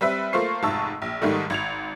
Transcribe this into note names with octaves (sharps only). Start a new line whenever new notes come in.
G3 C4 B4 E5
A3 A#3 F4 C5 C#6 C7
F1 G#2 A5 C#6 E6
A#1
G#2 D#3 G3 A3
G#1 G#6 F7